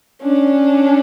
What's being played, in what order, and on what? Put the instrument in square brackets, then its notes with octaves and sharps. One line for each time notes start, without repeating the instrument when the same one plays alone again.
[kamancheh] C#4 [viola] D4